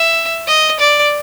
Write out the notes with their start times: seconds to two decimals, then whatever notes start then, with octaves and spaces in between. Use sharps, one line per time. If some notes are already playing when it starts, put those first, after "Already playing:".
Already playing: E5
0.47 D#5
0.79 D5